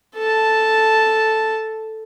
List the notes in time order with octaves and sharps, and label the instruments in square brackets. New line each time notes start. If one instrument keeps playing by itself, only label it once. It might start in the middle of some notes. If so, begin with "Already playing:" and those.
[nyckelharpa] A4 A5